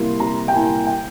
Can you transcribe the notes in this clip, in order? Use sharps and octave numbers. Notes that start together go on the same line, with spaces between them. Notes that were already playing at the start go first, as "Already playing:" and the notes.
Already playing: C3 G3 A#3 E4 C6
C3 A#5
G5
G3 A#3 E4 G#5
G5